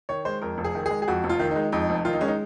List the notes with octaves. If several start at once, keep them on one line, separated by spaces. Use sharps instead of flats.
D#3 C#5
G#3 C5
F2 A#4
F1
G#4
D#3
G#4
G#3
G#4
F2 F#4
F1
F4
D#3
G#3 D#4
F2 D#4
F1
D#3 F4
D#4
G#3 C#4
D#4